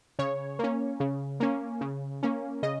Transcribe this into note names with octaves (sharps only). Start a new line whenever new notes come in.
C#3 C#5
A#3 C#4
C#3
A#3 C#4
C#3
A#3 C#4
C#3 D#5